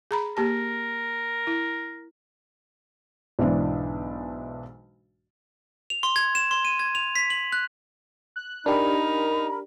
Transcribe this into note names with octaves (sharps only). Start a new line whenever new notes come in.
G#4 A#5 B5
A#3 G4 A#4 A5
E4
B1 G#2 E3 D4
F7
C6
G#6
E7
C6
D#7
G#6
F7
B6
F#7
F#6
F#6
D4 D#4 G4 A#4 B5